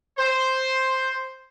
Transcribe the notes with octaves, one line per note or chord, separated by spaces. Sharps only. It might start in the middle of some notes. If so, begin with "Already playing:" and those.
C5